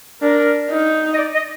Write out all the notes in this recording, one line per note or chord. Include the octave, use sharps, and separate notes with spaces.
D4 A#4
D#4
D#5
D5
D#5